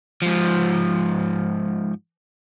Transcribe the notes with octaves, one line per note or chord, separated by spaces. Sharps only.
G#2 F3